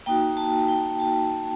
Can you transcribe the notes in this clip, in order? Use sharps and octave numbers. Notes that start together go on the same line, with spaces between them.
A#3 D#4 F#4 G5
A5
G5
A5